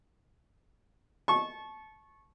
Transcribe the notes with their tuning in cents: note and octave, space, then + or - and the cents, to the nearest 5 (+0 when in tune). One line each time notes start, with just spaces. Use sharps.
A5 -25 C#6 -15